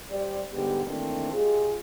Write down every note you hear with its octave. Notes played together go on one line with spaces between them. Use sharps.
G3 G4 C5 D5
G#2 D3 G3 G#3 B3 G4
D#3 E3 A3 A#3 C4 D4
G#3 F4 G4 G#4